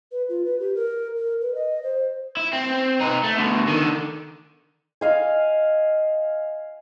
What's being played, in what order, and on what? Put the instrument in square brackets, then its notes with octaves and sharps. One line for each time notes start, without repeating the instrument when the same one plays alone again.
[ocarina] B4
F4
B4
G4
A#4
A#4
B4
D#5
C5
[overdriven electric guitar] E4
C4
D#4 B4
A3
D2 B2
D3 D#3
[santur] D#5 F5 G#5